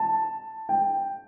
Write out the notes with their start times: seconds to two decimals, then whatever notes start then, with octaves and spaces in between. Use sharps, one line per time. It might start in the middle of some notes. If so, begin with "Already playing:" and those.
Already playing: A5
0.69 G5